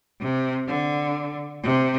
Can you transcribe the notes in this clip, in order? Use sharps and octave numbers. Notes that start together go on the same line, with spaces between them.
C3
D3
C3